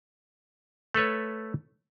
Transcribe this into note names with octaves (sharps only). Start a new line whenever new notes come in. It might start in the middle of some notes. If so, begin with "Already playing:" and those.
A3 A4 B4 C#5